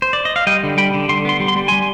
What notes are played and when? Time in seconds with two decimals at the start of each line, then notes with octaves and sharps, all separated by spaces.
0.02 C5
0.13 D5
0.25 D#5
0.36 F5
0.47 G3 D#5 G5
0.63 D3
0.78 G3 G5 B5
0.94 D3
1.09 D3 C6
1.25 B3 C6
1.40 G3
1.48 C6
1.56 G3
1.68 G3 G#5 C6